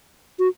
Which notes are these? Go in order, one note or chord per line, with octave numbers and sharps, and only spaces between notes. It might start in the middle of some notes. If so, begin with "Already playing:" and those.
F#4